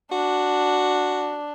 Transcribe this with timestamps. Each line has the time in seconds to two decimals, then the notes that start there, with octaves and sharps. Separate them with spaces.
0.12 D4 F#4